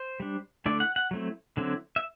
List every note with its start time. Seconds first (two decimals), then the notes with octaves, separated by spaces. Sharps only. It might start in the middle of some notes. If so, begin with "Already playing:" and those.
Already playing: C5
0.20 G3 D4
0.66 D3 A3 E4 D5
0.80 F#5
0.96 F#5
1.11 F#3 A3 C4 E4
1.57 D3 F#3 C4 E4
1.96 E5